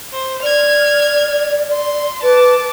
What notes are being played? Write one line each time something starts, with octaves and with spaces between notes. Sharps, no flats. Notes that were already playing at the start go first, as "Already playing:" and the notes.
C5
D5 F6 G#6
C6
B4 A5 D6